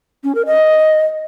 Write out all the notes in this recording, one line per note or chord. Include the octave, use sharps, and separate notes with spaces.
C#4
A#4
D#5